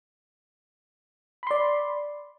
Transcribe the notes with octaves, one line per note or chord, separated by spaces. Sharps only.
D5 B5 C6